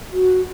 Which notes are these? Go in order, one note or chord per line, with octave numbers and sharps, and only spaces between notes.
F#4